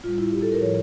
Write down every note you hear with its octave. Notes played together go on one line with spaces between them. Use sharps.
A2 G3 F4
E4
G4
A4
A#4
A2 F3 C#5